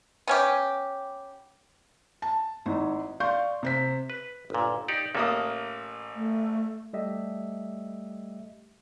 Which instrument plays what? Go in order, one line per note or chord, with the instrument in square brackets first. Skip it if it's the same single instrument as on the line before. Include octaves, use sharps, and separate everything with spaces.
[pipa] B3 C#4 G4
[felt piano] A5
G#1 D#4 E4
D5 F5 C6 C#6 G6
C3 C5 B6
[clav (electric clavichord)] B4
G1 A#2
D#4 G4 D5
[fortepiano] A1 A#3 D#6 [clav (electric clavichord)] A4
[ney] A3
[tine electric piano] G3 A3 G4 D#5 E5